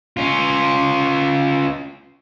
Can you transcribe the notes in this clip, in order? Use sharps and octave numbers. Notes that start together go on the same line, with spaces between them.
C#4 F4